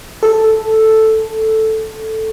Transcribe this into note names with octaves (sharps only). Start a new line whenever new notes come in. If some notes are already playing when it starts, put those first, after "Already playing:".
A4